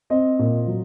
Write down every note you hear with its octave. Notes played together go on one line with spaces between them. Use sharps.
C4 D#5
A#2
F#3